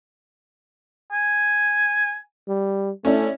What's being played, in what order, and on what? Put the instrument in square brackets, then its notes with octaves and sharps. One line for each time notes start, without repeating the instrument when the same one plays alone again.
[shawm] G#5
[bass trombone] G3
[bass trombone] A3 [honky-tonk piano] C#4 D4 E4